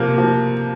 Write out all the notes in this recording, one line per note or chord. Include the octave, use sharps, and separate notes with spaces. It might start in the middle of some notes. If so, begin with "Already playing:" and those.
Already playing: C3 F3 A#3
F3